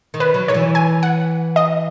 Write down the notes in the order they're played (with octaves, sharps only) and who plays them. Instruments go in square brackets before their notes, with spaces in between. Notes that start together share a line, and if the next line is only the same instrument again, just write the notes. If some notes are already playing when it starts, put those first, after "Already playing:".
[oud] D#3
[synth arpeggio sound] B4
[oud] F#3
[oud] D#3 [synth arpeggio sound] C#5
[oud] E3
[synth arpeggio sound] G#5
F#5
D#5